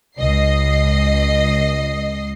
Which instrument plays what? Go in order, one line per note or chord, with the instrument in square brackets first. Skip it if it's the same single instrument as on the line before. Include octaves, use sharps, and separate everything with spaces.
[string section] C#2 D#5 C7